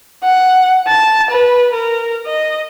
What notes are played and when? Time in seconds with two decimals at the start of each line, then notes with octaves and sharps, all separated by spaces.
0.23 F#5
0.88 A5
1.31 B4
1.73 A#4
2.26 D#5